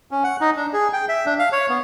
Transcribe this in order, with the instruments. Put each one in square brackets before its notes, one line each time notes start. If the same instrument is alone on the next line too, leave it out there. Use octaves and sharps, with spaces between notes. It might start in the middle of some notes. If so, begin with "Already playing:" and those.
[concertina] C#4
F#5
D#4
D4
G#4
G5
E5
D4
F5
C#5
B3